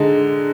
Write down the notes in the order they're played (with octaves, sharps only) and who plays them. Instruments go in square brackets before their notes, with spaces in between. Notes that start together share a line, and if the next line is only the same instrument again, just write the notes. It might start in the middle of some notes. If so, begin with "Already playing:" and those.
Already playing: [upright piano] D3 G#3 D#4